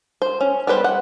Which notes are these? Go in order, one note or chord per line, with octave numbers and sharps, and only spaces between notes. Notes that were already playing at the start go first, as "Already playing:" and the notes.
C5
C#4
G3 B3 B4 C5
F#5